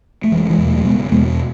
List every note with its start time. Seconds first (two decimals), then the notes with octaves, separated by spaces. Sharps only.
0.24 A3
0.32 F#1 E3 G#3
0.49 E3 G#3
0.58 E2 B2
0.67 F#3 A3
0.85 F#1 G#3 B3
1.12 E2 B2 G#3 B3